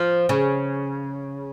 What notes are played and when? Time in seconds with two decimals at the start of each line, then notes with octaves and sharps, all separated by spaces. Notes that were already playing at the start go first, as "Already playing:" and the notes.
Already playing: F3
0.29 C#3